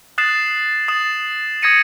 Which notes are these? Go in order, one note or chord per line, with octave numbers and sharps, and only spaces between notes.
D#6 F#6 A6 C7 E7
D#6 A6 E7
D#6 G#6 A#6 C#7 D#7